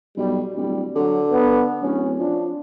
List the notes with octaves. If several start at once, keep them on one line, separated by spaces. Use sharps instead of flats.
B1 G3
D1 G3
D3 F#3
B3
D1 C#4
F3 D4